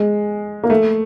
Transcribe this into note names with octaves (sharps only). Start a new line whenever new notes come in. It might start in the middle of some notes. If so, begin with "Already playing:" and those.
Already playing: G#3
A#3
A3